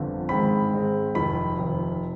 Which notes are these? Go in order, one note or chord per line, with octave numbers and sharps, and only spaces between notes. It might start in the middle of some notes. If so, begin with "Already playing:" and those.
Already playing: G1 F2 D3
G#2 D#3 G#3 C4 B5
G#2 D#3 G#3 C4
F1 F2 D#3 B5
F1 F2 D#3